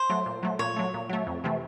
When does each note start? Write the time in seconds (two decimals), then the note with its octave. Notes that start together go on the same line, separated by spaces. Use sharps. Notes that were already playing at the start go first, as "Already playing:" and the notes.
Already playing: C5
0.10 F#3 A3
0.26 A#2
0.43 F#3 A3
0.59 A#2 C#5
0.76 F#3 A3
0.94 A#2
1.09 F#3 A3
1.27 F2
1.44 C3 E3 A3